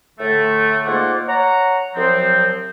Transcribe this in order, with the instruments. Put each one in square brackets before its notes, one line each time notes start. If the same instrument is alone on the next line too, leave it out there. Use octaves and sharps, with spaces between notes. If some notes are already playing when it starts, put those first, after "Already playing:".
[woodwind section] A2 D3 A3
G#2 A#3 F4 D5 F#5
C#5 F#5 A#5
C2 F3 F#3 C4